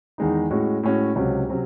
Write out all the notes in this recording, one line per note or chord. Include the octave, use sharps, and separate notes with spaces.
E2 D#3 G#3 D#4
A2 G#3 C#4 F#4
A2 G#3 C#4 F#4
C#2 C3 F#3 C#4 F#4
C3 F#3 C#4